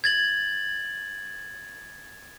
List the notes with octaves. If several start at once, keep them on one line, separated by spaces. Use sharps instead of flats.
G#6 A6 F#7